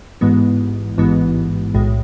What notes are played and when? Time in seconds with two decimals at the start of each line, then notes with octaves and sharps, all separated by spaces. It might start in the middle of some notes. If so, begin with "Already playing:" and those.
0.21 A1 G#2 E3 G#3 B3
0.98 A1 G#2 E3 G#3 B3
1.74 B1 A2 G#3